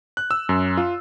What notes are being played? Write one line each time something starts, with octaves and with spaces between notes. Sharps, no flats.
F#6
E6
F#2
F4